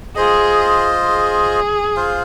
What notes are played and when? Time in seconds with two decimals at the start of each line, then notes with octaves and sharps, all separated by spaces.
0.16 F4 G#4 C5 D#5
1.07 G#4
1.97 F4 C5 F5